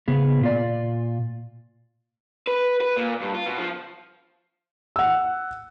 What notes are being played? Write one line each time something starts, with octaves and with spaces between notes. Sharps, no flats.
C#3 B3 G#4
A#2 F4 D5
B4
B4
A#2
G2
F4
B2
F3
F#5 E6